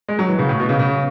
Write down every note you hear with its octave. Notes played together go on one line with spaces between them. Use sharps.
G#3
F#3
E3
C#3
A2
B2
C#3
C#3